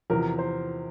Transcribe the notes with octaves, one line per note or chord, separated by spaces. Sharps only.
E2 C3 F3 A#4
C5